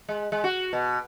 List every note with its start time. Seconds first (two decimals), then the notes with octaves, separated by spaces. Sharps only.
0.09 G#3
0.32 G#3
0.44 F#4
0.73 B2